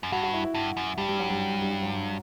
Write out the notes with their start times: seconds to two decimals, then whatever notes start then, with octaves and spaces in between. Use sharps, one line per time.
0.03 F#2
0.12 G2 F#4
0.23 F#4
0.33 E4
0.44 E4
0.54 G2
0.77 F#2
0.98 G2 G3
1.09 G3
1.19 F#3
1.30 G3
1.62 G3
1.83 F#3